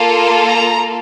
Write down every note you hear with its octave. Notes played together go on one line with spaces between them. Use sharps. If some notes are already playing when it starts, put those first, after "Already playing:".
Already playing: A#3 F4 A4
A#5